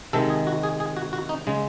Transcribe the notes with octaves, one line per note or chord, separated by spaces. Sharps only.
C3 D#3 G#3 A4
G#4
F#4
G#4
G#4
F#4
F#4
D#4
C#3 G#3